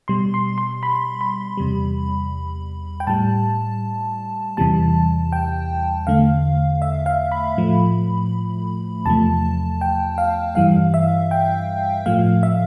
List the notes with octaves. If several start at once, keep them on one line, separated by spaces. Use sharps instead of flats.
B2 G3 C6
C6
C6
B5
B5
E2 C3 G3
G5
A2 G3 A5
E2 C3 E3 G3 A5
G5
E2 D3 A3 F5
E5
F5
B5
A2 F3 A3
E2 C3 F3 A3 A5
G5
F5
G2 E3 G3 F5
E5
G5
A2 F3 A3 F5
E5